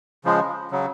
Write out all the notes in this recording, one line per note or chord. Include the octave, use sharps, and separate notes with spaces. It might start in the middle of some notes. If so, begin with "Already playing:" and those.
C#3 F3 G#3
C#3 F#3